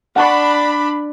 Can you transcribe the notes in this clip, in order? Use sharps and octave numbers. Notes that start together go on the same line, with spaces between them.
D4 F#5 A5 B5 C#6